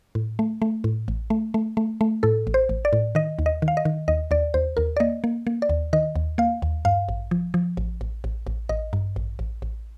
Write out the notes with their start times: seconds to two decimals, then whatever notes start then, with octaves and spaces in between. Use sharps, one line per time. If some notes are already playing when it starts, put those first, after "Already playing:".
0.15 A2
0.39 A3
0.62 A3
0.84 A2
1.08 A1
1.30 A3
1.54 A3
1.77 A3
2.01 A3
2.23 A2 A4
2.47 A1
2.54 C5
2.69 A1
2.85 D5
2.93 A2
3.15 D#3 D#5
3.39 D#2
3.46 D#5
3.62 D#3
3.68 F5
3.77 D#5
3.85 D#3
4.08 D#2 D#5
4.31 D#2 D5
4.54 D#2 C5
4.77 D#2 A#4
4.97 D5
5.00 A#3 D#5
5.24 A#3
5.47 A#3
5.62 D5
5.69 D#2
5.93 D#3 D#5
6.16 D#2
6.38 A#3 F5
6.62 D#2
6.85 G2 F5
7.09 A1
7.31 F3
7.54 F3
7.77 A1
8.01 A1
8.24 A1
8.47 A1
8.69 A1 D#5
8.93 G2
9.16 A1
9.39 A1
9.62 A1